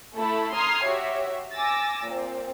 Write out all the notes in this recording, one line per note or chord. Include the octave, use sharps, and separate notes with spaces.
A3 E4 A4 A5 B5
A#5 C6 D#6 F6 G#6 C7
F#4 G4 C#5 E5
G#5 D6 E6 A6 A#6
A#2 C4